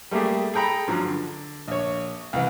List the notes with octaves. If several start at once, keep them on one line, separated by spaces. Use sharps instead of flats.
G3 A3 A#3 G4 G#4
G#4 A4 G5 A#5 B5
G2 F3 F#3
D3
A#1 C#5
C2 E3